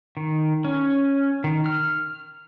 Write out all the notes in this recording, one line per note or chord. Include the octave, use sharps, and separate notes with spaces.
D#3
C#4
D#3
F6